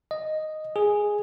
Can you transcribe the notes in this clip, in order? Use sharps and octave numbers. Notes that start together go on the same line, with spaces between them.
D#5
G#4